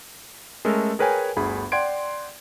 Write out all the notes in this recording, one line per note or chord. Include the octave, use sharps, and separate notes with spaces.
G#3 A3 C#4 A4 A#4
G#4 A#4 B4 C#5 G5 G#5
G1 D2 G#4 B5
D5 F#5 G5 C6 G#6 D7